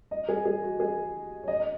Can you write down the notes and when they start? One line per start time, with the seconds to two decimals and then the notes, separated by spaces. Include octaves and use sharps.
0.11 D#5
0.29 G#4
0.46 G#4
0.63 F#4
0.80 G#4
1.43 C#5
1.48 D#5
1.60 D#5